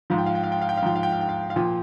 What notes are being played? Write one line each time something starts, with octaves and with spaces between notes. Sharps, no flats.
G#2 F3 F5
G5
F5
G5
F5
G5
F5
G5
F5
G#2 F3 G5
F5
G5
F5
G5
F5
F5
A#2 F3 G5